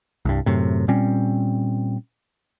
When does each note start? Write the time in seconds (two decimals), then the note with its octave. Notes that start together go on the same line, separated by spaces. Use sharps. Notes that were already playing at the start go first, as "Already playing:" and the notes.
0.25 C2 G2
0.46 F#2 A2 C3
0.88 A#2 G3 C4 C#4